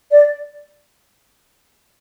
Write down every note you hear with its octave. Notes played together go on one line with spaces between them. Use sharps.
D5